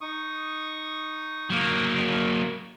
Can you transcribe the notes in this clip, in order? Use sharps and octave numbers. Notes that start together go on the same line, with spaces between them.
D#4 C#6 D#6
F#3 A#3